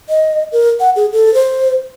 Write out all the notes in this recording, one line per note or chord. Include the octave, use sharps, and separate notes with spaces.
D#5
A#4
F#5
G#4
A4
C5